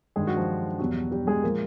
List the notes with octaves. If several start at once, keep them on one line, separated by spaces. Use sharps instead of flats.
G2 D#3 G#3 G#4
F#3 F#4
F3 F4
E2 B2 F#3 G3 F#4
G3 G4
G#3 G#4
A#2 F3 G#3 A#3 A#4